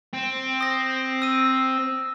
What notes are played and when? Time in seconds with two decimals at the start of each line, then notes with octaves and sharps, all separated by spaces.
0.14 C4
0.61 D#6 A#6
1.22 E6 D#7